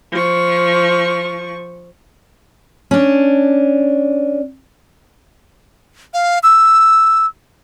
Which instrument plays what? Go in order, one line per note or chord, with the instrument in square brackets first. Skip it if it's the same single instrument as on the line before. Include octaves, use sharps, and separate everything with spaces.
[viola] F3 C#6
[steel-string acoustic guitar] C#4 D4
[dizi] F5
E6